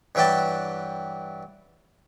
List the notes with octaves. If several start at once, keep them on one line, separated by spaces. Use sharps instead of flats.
G2 E3 F#3 G4 G5 A5